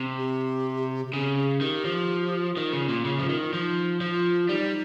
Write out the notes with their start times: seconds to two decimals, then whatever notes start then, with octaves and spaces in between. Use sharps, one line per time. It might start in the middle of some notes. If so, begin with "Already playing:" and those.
Already playing: C3
0.17 G4
1.06 G4
1.13 C#3 G#4
1.37 G#4
1.61 D#3 G4
1.85 F3
2.57 D#3 F4
2.73 C#3
2.89 A#2
3.05 C#3
3.19 F3
3.29 D#3
3.48 F4
3.53 F3 D#4
4.01 F3 F4
4.43 F4
4.49 G3 D#4